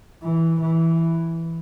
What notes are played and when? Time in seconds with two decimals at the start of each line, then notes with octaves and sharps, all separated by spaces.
0.23 E3
0.61 E3